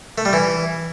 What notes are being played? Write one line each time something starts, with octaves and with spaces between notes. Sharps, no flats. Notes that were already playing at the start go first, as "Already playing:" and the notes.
A3
G3
E3